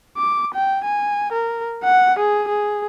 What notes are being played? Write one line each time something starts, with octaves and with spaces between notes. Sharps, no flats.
D6
G5
G#5
A#4
F#5
G#4
G#4